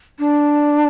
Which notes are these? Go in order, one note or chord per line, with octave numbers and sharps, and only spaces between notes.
D4